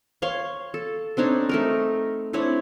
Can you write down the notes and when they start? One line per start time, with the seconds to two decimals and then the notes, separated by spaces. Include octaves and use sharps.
0.22 C#5 F5 C6 C#6
0.74 A4
1.17 C4 D4 D#4 C#5
1.49 A3 D#4 A#4
2.33 C4 D4 E4 C#5